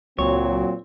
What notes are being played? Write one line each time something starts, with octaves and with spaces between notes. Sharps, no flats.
C#2 A#2 F#3 C4 C#5